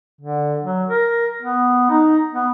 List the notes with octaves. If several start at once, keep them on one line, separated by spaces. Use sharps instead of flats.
D3
F#3
A#4
B3
D#4
B3